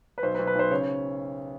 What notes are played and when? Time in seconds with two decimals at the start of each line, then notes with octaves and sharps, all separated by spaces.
0.18 B4
0.22 B1 C5
0.34 B4
0.39 B1
0.47 B4
0.55 B1 C5
0.71 C#3 C#5